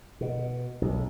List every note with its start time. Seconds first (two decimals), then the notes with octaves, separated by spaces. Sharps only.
0.21 B2
0.82 B1